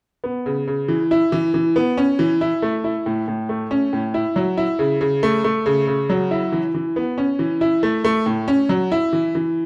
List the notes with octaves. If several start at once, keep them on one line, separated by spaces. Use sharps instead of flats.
B3
C#3
C#3
E3
E4
E3
E3
B3
C#4
E3
E4
A3
E4
A2
A2
A3
C#4
A2
E4
F#3
E4
C#3
C#3
A3
A3
C#3
C#3
F#3
E4
E3
E3
B3
C#4
E3
E4
A3
A3
A2
C#4
F#3
E4
E3
E3